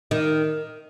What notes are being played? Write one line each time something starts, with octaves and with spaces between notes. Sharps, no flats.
D#3